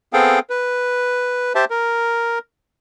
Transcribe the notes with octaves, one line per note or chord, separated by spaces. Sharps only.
B3 C4 G#4 A4 F5 G5
B4
G4 C5 E5 A5
A#4